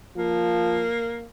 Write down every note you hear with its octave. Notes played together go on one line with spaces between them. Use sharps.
F3 A#3